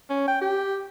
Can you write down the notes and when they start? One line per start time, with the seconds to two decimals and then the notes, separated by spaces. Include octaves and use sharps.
0.10 C#4
0.28 G5
0.42 G4